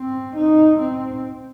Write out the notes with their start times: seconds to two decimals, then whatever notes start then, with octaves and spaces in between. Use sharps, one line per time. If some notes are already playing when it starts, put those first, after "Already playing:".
Already playing: C4
0.36 D#4
0.79 C4